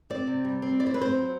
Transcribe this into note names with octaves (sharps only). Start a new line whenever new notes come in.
C4 D5
C3
G3
C4
E4 D5
C5
B4
C4 C5
F#3